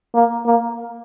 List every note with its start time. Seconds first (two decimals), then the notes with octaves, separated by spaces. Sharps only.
0.15 A#3
0.46 A#3